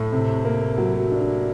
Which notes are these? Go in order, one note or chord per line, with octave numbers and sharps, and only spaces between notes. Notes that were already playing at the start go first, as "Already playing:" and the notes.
Already playing: A2
C3
A#3
F#3
D4